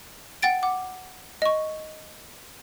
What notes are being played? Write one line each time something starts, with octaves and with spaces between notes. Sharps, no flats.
F#5 G5 A6 D7
F#5 D6
D#5 C#6